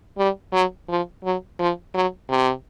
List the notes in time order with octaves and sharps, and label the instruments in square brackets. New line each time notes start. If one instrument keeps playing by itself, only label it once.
[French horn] G3
F#3
F3
F#3
F3
F#3
C3